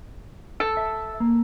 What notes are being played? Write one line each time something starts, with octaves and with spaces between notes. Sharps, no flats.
A4
E5
A#3